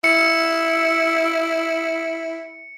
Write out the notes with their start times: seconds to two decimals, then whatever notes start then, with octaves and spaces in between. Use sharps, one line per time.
0.04 E4 C#7